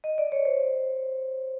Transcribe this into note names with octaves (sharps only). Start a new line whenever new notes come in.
D#5
D5
C#5
C5